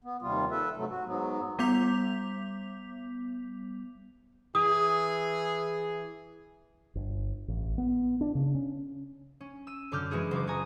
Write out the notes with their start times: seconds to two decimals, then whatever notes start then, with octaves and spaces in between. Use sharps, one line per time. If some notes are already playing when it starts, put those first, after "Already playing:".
0.04 B3
0.22 D#2 C3 G3 F4
0.51 A4 B4 E5
0.77 G#2 C3 F#3 A3
0.90 F#4
1.06 G#2 F#3 B3
1.59 G3 B3 D6 G6 B6 F7
4.55 E3 G#4 D#6
6.95 G1
7.48 A1
7.78 B3
8.21 D4
8.35 C#3
8.55 C#4
9.41 C#4
9.67 E6 D#7
9.92 F#2 D3 D6 F6 G6
10.11 E3 G#3 E4 F#4 G#4
10.31 F#1 F4 F#4 D6
10.47 F#4 G#4 G#5 A#5 D#6